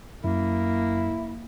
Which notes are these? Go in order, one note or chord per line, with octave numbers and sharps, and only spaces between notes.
F#2 A#3 E4